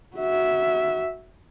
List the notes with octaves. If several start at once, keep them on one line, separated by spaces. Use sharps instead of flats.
F#4 E5